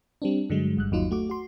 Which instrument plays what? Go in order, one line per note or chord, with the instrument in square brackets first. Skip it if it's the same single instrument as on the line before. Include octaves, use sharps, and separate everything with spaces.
[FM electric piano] G3 C4 D4
G2 D3 F#3 G#3
G1 G2 F#6
G1 D#2 F#3 D#4 F4
A3 F#4 D6
F#4 C6